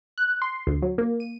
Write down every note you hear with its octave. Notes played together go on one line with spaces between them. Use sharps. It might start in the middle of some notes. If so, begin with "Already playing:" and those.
F#6
C6
D2
F#3
A#3
D#7